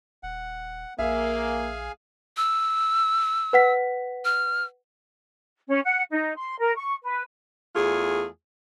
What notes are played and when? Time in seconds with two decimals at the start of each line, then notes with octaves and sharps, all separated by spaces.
0.23 D#1 F#5
0.99 A#1 A#3 G#4 E5 F5 G#5
2.37 E6
3.53 B4 F#5 B6
4.25 F6
5.68 C#4
5.85 F#5
6.12 D#4
6.38 C6
6.60 A#4
6.76 C#6
7.04 B4
7.76 E2 A3 F4 G#4